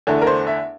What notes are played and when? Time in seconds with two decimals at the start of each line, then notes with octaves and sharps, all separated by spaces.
0.07 E2 D3 A3
0.22 A#4
0.27 C5
0.47 E5